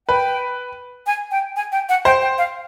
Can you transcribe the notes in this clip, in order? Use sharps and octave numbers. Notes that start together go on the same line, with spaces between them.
B4 G5
G#5
G5
G#5
G5
F#5
C5 G5
G5
F5